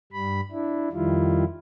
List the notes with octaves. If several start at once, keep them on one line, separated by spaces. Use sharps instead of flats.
G2 G3 B5
D4 E4
F2 D#3 G3 E4 F4